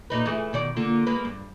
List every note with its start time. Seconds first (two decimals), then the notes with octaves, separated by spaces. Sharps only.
0.10 A#2 D#4 B4
0.26 E3 A3 G#4
0.53 B2 D#3 D5
0.76 D3 A#3 F4
1.07 G#3 A#3 B4
1.25 G2